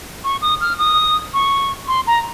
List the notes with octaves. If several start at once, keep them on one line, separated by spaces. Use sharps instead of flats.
C#6
D#6
F6
D#6
C#6
C6
A#5